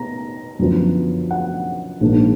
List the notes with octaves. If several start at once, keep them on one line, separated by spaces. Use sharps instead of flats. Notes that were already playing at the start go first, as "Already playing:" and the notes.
Already playing: B3 D#4 A#5
F#2 D3 F3 B3
F#5
A#1 G#2 D#3 A#3 D4